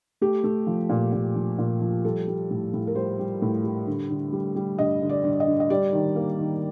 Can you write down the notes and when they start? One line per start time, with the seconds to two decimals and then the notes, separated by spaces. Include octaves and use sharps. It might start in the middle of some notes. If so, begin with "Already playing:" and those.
0.21 A3 G4
0.44 A3
0.67 F3
0.89 A#2
1.13 A#2
1.36 F3
1.58 A#2
1.81 F3
2.04 G3 A4
2.28 G3
2.50 A2
2.74 A2
2.87 A#4
2.95 G3 C5
3.19 G3
3.42 A2
3.64 G3
3.87 D3
4.10 D3
4.32 G3
4.56 G3
4.78 G2 D#5
5.01 D3
5.09 D5
5.24 G2
5.40 D#5
5.47 D3
5.60 D#5
5.70 G3 D5
5.93 D#3
6.16 A#3
6.38 D#3